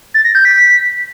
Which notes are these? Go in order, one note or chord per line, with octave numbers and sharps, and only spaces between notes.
A6
A#6
G6
B6